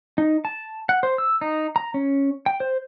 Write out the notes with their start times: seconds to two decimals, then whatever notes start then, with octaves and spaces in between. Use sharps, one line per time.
0.18 D#4
0.45 A5
0.89 F#5
1.03 C5
1.18 E6
1.41 D#4
1.76 A#5
1.94 C#4
2.46 G5
2.60 C5